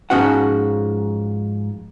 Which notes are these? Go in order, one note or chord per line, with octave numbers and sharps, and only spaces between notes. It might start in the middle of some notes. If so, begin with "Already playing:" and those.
G#2 F3 C#4 F#4 F#5